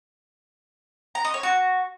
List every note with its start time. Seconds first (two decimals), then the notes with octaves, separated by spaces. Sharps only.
1.15 A#5
1.24 D#5
1.34 C#5
1.43 F#4